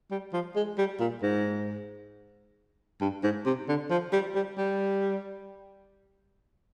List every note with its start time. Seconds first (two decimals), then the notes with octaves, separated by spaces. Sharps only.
0.11 G3
0.33 F3
0.56 G#3
0.78 G3
1.00 A#2
1.22 G#2
3.01 G2
3.23 G#2
3.46 C3
3.68 D3
3.90 F3
4.13 G3
4.35 G3
4.57 G3